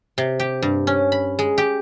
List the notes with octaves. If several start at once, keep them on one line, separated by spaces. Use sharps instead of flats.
C3
G4
G2
C#4
B5
G#3
G4